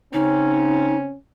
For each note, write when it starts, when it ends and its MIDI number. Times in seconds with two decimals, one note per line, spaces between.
0.13 1.15 49
0.13 1.15 60
0.13 1.15 61
0.13 0.96 63